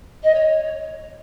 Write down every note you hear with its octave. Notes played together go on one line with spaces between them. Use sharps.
D#5
C#5